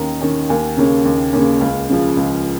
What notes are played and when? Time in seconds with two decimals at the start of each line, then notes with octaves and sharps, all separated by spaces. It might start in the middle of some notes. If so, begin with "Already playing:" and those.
Already playing: D#2 D#3 C#4 A#5
0.21 D#3 C#4
0.49 D#2 G#5
0.77 C#3 A#3 C#4
1.05 D#2
1.33 C#3 A#3 C#4
1.61 C#2 F5
1.89 C#3 F3
2.17 C#2